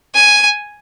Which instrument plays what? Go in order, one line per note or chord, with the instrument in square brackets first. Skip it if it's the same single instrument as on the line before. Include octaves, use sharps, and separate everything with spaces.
[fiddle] G#5